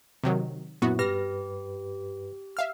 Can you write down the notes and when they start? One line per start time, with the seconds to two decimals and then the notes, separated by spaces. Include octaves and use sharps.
0.24 C3 D#3 F#3
0.82 F#2 A#2 B3 E4 F#4
0.99 G2 G4 B4 F6 A#6
2.57 E5 F5 F6